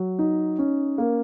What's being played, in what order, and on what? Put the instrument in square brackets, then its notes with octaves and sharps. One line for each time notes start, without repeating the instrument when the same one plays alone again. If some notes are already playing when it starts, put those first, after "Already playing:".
Already playing: [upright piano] F#3
D#4
C#4
A#3